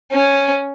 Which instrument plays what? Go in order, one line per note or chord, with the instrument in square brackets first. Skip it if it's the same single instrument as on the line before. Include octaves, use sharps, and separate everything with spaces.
[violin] C#4